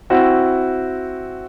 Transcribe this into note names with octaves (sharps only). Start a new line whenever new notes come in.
C4 E4 F#4